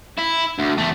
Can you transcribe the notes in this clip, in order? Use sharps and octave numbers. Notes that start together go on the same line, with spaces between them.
E4
D2
E2 A3